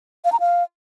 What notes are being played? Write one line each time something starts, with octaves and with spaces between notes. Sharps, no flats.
F5
A#5
F5